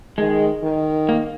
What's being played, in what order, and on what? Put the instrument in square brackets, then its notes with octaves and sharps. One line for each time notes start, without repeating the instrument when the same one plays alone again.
[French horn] D#3 [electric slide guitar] G#3
[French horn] D#3
[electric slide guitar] A#3